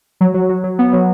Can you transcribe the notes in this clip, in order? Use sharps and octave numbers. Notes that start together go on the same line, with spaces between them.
F#3
F#3
F#3
F#3
B3
F#3